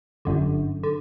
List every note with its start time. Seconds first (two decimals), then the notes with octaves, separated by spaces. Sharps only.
0.25 G1 F#2 D3
0.83 D3